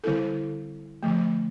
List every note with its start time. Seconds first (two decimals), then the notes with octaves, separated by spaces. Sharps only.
0.04 D3 G3 C4 E4 A4
1.03 D3 F3 A3